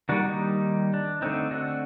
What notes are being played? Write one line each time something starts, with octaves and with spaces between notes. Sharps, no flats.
D#3 G3 A#3 D4 F#4
D#4
D4
D3 A3 C4 D#4
D4 F#4